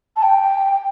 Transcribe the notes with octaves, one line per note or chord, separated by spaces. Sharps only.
A5
G5